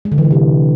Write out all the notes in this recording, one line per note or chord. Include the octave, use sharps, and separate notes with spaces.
G#3
D3
E3
D3
C3